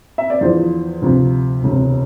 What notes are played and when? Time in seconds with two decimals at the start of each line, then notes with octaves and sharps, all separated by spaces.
0.18 E5
0.30 D5
0.41 E2 D3 F3 C5
1.02 D2 C3 F3
1.63 E1 D2 C3